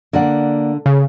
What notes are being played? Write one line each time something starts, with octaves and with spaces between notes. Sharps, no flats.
D3 A#3 D5 F#5
C#3